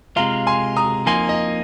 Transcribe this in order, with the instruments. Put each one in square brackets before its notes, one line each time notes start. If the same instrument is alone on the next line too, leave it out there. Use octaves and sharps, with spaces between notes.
[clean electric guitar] C3 G#3 F4 [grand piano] F5 A#5
[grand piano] G#5 C6
A#5 D#6
[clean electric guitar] F2 F3 A#3 D#4 [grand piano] G#5 C6
[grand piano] D#5